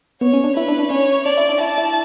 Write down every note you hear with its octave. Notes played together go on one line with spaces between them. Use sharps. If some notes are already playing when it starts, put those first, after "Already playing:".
B3 C#5
C#4
D4
E4 B4
D4
D4
C#4 C#5
D4 D5
E4
D4
E4 A5
E4